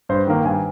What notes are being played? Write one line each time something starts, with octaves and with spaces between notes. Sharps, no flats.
G2 C5
D#3 A#3
G2 G#5